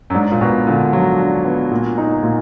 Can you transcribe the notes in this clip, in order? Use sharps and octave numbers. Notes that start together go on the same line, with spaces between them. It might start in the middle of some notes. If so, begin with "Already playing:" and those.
F#2
G#2 D4
A#2
B2 B3
A#2 D3
F3 F#3
D4
B3
A#2
D#4
A#2